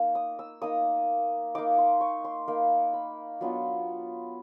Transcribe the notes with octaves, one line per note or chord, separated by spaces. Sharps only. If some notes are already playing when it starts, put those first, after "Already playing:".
Already playing: A#3 D#4
D#6
E6
A#3 D#4 D#6
A#3 D#4 D6
C6
C#6
C6
A#3 D#4 B5
B5
F#3 B3 D4 F4